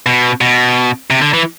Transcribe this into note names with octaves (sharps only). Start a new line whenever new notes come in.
B2
B2
C3
D3
E3